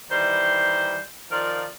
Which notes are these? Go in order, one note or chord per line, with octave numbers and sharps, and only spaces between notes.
D#3 E3 G3 C5
D#3 F3 F4 A#4 D5